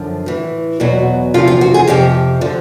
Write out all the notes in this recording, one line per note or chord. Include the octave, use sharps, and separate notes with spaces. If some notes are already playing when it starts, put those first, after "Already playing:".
Already playing: F#2 D3 F3
A2 E3
E2 B2 F#3 F#4
E2 C3 F3 F4
F4
F#4
G#4
F2 C3 F3 G4
D3 F3